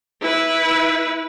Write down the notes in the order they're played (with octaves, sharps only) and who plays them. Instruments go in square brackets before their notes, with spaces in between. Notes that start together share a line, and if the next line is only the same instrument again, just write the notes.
[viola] E4 B4